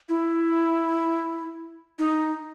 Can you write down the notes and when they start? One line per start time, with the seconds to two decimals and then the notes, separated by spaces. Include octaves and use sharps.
0.09 E4
1.99 D#4